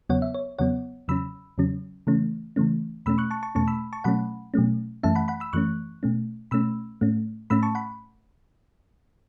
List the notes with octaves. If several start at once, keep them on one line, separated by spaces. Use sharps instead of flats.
E2 C#3 F#3 B3 C#5 F#5
E5
C#5
E2 C#3 F#3 B3 C#5 F#5
E2 C#3 F#3 C#4 B5 E6
E2 C#3 F#3 C#4
C#3 E3 A3 C#4
C#3 E3 A3 C#4
E2 B2 A3 C#4 B5 E6
C#6 F#6
A5 C#6
A5 C#6
E2 B2 A3 C#4 A5 C#6
B5 E6
A5 C#6
B2 F#3 A3 C#4 F#5 B5
B2 F#3 A3 C#4
F#2 E3 A3 C#4 E5 A5
F#5 B5
F#5 B5
B5 E6
F#2 E3 A3 C#4 C#6 F#6
B2 A3 C#4
B2 A3 C#4 B5 E6
A2 A3 C#4
A2 A3 C#4 B5 E6
A5 C#6
F#5 B5